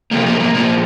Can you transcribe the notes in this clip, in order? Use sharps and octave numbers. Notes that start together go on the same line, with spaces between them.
C3 F3 A3 A#3
A#3
A#3
A#2 F3 G#3 A#3